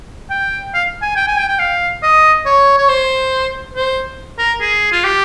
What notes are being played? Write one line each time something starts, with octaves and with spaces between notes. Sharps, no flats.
G5
F5
G#5
G5
G#5
G5
G5
F5
D#5
C#5
C#5
C5
C5
A#4
G#4
F4
G4